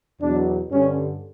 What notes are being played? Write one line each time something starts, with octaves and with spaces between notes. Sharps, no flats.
E2 B2 F#3 D4
G2 D3 G3 C#4